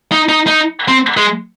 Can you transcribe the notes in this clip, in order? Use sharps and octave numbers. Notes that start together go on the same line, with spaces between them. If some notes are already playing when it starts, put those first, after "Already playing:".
D#4
D#4
D#4
C4
G#3